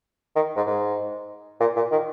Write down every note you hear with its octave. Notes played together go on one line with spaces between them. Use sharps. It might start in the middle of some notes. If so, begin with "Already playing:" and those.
D#3
G#2
G#2
A#2
A#2
D#3